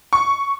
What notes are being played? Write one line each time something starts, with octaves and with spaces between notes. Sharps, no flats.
C#6